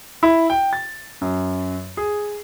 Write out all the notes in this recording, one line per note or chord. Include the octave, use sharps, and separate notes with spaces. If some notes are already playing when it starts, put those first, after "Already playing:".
E4
G5
A6
F#2
G#4